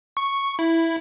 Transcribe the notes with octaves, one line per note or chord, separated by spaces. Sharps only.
C#6
E4